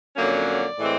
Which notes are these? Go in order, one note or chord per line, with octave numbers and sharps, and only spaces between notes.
F2 D3 F#3 A#3 C#4 D5
A2 E3 G#3 C4